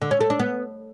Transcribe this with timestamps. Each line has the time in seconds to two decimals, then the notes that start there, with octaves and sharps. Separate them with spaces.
0.02 D3
0.11 C#4
0.21 A3
0.30 D4
0.40 B3